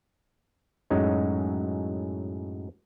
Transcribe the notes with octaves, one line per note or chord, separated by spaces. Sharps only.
F#2 A2 F#3 G#3 C#4 D#4